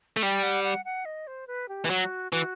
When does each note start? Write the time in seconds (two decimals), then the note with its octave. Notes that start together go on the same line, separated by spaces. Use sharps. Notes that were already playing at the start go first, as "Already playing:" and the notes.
0.17 A3
0.22 G3 G5
0.43 F#5
0.64 F#5
0.85 F#5
1.05 D#5
1.27 C5
1.47 B4
1.69 G4
1.85 E3
1.90 F#3 F#4
2.32 E3 F#4